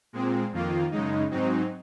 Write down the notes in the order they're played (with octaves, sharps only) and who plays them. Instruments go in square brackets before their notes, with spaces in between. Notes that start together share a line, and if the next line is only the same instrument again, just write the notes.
[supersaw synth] A#2 G#3 C4
F2 D#3 A#3 F4
F#2 C#3 G#3 D#4
G#2 F#3 C4 D#4